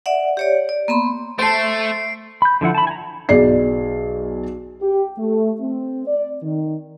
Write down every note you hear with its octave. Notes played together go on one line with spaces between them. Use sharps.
D5 E5 F#5
G4 C#5 D5
D5
A#3 B3 B5 C6
A3 C5 A5 C7 D7
B5 G6
D3 F3 E4 F#5
A5 B5
G#5 A#5
B1 G#4 D5 C7
G4
A3
C4
D5
D#3